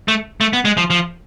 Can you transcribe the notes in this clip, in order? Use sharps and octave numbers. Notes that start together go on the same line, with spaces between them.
A3
A3
B3
G#3
F3
F3